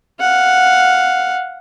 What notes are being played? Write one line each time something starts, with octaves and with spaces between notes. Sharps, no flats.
F5 F#5